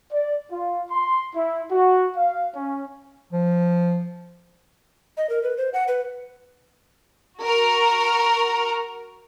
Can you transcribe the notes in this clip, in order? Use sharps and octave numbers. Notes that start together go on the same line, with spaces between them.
D5
F4
C6
E4
F#4
F5
C#4
F3
D#5
A#4
B4
C5
F#5
B4
F#4 A#4